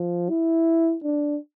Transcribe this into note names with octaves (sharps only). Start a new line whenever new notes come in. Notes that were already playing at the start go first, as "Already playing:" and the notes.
Already playing: F3
E4
D4